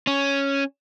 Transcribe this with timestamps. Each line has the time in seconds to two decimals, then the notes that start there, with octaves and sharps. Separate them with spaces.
0.07 C#4